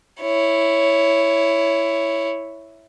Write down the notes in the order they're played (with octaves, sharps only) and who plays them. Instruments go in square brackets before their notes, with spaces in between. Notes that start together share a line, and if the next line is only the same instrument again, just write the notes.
[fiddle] E4 C#5